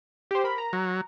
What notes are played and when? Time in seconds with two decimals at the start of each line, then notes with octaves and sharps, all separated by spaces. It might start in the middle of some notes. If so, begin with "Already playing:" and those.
0.31 G4 C5
0.44 A#4 B5
0.58 A#5
0.73 F#3